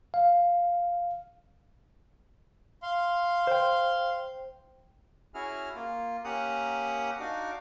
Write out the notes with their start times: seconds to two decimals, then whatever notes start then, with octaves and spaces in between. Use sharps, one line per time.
0.14 F5
2.82 F5 C6
3.47 C5 G5
5.34 C#4 E4 F#4 G#4 F6
5.75 A#3 F4
6.25 A#3 C#4 G4 F#5 A#5 D#6
7.20 D4 D#4 F#4 F5 D6